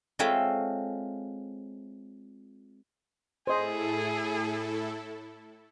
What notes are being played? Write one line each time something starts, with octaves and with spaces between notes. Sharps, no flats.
G#3 C4 F4 A4 C#5 E5
A2 E4 G#4 A4 C5 D#5